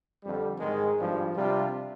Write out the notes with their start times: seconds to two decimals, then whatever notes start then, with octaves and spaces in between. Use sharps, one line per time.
0.21 F2 D3 G3
0.59 G#2 D#3 G#3
0.98 G#1 G2 F3
1.35 C3 G3 D4 F4